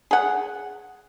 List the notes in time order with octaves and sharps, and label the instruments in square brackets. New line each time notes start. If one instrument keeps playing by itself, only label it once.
[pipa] G#4 F#5